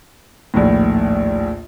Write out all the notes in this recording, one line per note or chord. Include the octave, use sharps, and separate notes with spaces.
A#1 D#2 A2